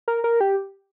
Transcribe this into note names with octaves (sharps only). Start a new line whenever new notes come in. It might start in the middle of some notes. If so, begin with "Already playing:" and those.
A#4
A#4
G4